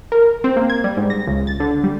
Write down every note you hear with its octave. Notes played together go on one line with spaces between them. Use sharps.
A#4
C4
A#3
G#6
G3
G#2
A#6
C#2
A6
D3
G3